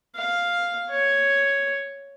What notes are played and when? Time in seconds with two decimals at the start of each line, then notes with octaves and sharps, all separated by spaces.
0.15 F5
0.90 C#5